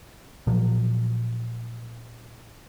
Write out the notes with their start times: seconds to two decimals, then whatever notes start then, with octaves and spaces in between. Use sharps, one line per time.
0.47 A#2 F3 F#3